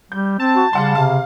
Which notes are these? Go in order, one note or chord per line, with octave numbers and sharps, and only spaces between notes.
G3 G6
C4 A5
F#4
C#3 G3 F5 F#5 C6
C3 F5